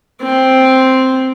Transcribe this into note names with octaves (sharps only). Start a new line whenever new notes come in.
C4